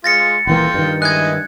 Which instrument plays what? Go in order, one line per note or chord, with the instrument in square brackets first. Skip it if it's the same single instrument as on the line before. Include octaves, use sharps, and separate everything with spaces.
[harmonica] G#3 F4 [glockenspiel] A6 A#6 C#7
[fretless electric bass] D#1 E3 A#3 [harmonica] F4 G5 C6
[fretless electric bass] G2 D#3
[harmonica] E4 D#5 G#5 [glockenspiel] F#6 G#6